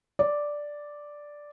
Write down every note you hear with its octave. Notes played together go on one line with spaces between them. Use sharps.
D5